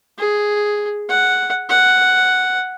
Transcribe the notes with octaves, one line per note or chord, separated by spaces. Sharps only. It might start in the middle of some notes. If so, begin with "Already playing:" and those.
G#4
F#5
F#5